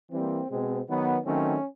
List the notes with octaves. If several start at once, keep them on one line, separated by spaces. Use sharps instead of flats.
E3 G3 A#3 C4
B2 G#3 C4
D#3 F#3 B3
D#3 F#3 A3 C4 C#4